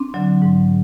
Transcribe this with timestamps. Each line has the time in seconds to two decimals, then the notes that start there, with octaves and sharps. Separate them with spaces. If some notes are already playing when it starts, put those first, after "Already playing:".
Already playing: C4 D4
0.14 D3 F#3
0.42 G#2